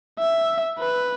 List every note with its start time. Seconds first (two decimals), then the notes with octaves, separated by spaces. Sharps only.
0.19 E5
0.79 B4